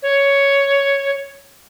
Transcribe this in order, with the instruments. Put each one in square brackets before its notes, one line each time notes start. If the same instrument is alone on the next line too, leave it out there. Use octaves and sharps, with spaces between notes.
[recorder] C#5